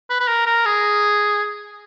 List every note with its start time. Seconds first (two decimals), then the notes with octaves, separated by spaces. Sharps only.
0.10 B4
0.20 B4
0.28 A#4
0.46 A#4
0.66 G#4